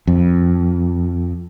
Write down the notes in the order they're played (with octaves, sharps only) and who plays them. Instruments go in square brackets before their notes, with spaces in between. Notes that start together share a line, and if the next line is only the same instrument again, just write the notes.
[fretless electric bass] F2